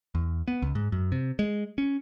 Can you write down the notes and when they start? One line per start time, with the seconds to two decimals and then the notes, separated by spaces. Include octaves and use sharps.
0.15 E2
0.48 B3
0.62 C#2
0.75 G#2
0.92 F#2
1.12 C3
1.39 G#3
1.78 C#4